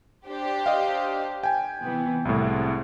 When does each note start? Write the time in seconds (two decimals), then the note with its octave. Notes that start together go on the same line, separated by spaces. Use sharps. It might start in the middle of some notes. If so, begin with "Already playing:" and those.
0.28 D4 G4 C5
0.66 D#5 F5
1.43 G5 G#5
1.80 C3 E3 B3
2.25 C2 A2 G#3 A3 C4